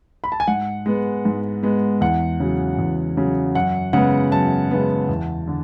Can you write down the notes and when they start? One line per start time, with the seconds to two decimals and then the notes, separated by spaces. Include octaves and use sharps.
0.24 B5
0.32 A5
0.40 G#5
0.48 G#2 F#5
0.86 G#3 B3
1.25 G#2
1.63 G#3 B3
2.01 E2 F#5
2.40 C#3 F#3
2.78 E2
3.17 C#3 F#3
3.55 F#2 F#5
3.93 C#3 G#3 B3 F#5
4.32 F#2 A5
4.71 C#3 G#3 B3
5.09 E2
5.47 D3